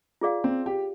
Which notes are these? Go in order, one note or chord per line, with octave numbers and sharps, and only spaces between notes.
F4 G#4 D5 F5
C4
G4